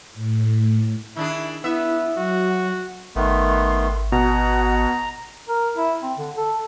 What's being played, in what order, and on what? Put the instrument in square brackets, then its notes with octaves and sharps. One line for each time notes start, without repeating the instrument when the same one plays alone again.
[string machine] A2
[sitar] D#3 D4 G#4 [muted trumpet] E4
[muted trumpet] B3 [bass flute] E4 [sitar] E5
[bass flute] F#3 [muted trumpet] F#4
[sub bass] G#1 [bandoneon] D#3 A3 B3 [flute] C6
[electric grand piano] B2 [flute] F#5 [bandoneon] A#5
[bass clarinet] A#4
E4
C4
D3
A4